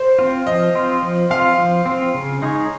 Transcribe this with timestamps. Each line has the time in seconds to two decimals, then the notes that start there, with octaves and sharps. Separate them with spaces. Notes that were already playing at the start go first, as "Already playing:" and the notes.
Already playing: C5
0.19 C4 F4
0.46 F3 D#5
0.75 C4 F4
1.03 F3
1.30 C4 F4 F5
1.58 F3
1.86 C4
1.91 F4
2.15 C#3
2.42 G#3 D#4 G#4 C#5